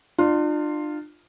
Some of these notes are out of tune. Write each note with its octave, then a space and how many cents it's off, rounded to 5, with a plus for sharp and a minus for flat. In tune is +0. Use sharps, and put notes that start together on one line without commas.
D4 +40 F4 +0